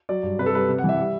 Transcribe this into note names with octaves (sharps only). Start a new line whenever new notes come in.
F#3 D5
G2
C3 B4
A4
G3 B4
C3
F#5
E3 E5
G3